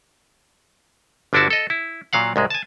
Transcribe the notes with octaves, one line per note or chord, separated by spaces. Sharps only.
G1 D3 D4 E4 F#4 A5
A4 D#5
E4
A#2 F#3 F5 F#5
C2 G#2 G#3
G#5 A5